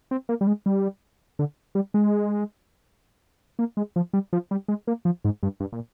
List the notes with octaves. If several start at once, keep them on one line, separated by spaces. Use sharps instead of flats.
C4
A#3
G3
G#3
G3
D3
G3
G#3
A#3
G#3
F3
G3
F3
G3
G#3
A#3
F3
G#2
G2
G2
A#2